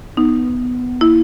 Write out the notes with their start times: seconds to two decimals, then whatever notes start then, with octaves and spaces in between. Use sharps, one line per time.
0.17 B3 D#4
1.01 A#3 E4